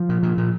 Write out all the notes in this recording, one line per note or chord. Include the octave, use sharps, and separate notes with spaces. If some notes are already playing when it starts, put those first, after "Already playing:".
Already playing: F3
A#2
A#2
A#2